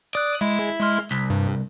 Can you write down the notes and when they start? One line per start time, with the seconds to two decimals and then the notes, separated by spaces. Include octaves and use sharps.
0.15 D5 D#6 F#6
0.41 G#3 E4
0.81 G#3 C6 F6
1.11 C2 B6
1.30 G2